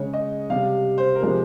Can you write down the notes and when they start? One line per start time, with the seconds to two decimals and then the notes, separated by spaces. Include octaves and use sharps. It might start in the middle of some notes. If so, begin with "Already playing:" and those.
Already playing: C#3 G#3 C#5
0.13 D#5
0.50 C3 G3 F5
0.98 C5
1.15 A#4
1.22 C3 F3 G#3 C5